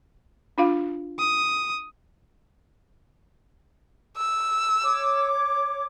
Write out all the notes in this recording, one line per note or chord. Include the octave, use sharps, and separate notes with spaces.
D4 F4 F5
D#6
E6
C#5 D6